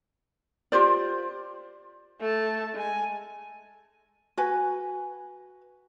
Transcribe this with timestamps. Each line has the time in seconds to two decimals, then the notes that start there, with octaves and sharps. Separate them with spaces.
0.72 F4 G4 C5 D5
2.21 A3 A5
2.75 G#3 G#5
4.37 F#4 B4 G#5